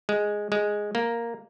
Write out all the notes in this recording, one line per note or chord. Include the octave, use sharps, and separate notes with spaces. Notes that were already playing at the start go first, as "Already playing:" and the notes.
G#3
G#3
A#3